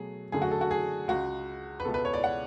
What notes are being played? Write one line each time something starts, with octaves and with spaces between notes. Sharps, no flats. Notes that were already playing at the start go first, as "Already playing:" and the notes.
Already playing: B2 F#3 A3 G#4
F#2 D3 A3 G#4
F#4
A4
F#4
G#4
C#2 C#3 G#3 F#4
B4
C#2 B2 G#3 B3 A4
B4
C#5
D5
F#5